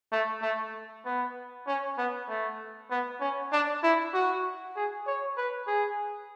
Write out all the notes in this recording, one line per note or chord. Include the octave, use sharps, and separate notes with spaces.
A3
A3
B3
C#4
B3
A3
B3
C#4
D4
E4
F#4
G#4
C#5
B4
G#4